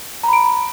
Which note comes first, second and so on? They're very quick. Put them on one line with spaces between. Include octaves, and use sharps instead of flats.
A#5 B5 D7